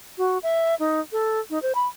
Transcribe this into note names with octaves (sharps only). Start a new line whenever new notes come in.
F#4
E5
D#4
A4
D#4
C5
B5